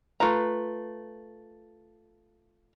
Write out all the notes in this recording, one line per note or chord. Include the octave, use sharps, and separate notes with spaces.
A3 F4 B4 A#5